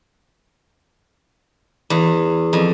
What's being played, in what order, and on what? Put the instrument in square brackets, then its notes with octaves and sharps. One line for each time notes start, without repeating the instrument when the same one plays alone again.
[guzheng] E2
F2